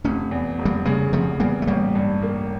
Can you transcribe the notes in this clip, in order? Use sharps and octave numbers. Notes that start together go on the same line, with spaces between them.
F1 A3 C#4
E2
F1
G3 A#3
C#3 G3 A#3
F1 F3 A3
E2 G3 A#3
A3
A1 G3 A#3
G2
A#3